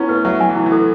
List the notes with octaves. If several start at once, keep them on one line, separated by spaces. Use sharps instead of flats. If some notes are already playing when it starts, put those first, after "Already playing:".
Already playing: B3 C#4 E4
A3 B4
F#3 E5
F#3 G#5
E3
E4
E3
A4